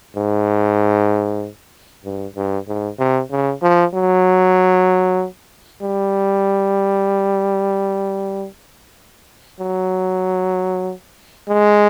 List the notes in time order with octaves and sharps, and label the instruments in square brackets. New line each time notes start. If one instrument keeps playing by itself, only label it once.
[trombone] G#2
G2
G2
G#2
C3
C#3
F3
F#3
G3
F#3
G#3